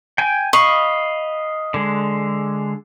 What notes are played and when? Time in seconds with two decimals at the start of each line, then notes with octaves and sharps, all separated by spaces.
0.18 G5 G#5
0.53 D#5 F5 B5 C#6
1.74 D3 G#3